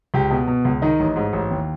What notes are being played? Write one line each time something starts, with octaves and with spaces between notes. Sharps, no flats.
C#2 G4
B2
B2
C#2
D#3 D#4
A1
G#2
A1
D#2